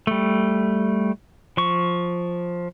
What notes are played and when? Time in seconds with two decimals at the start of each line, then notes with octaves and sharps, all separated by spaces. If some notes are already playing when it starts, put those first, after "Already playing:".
0.07 G3 A3
1.57 F3 C#6